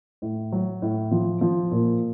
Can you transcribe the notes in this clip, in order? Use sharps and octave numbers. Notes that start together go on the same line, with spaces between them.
A2
F#3
A2
F3
F3
A#2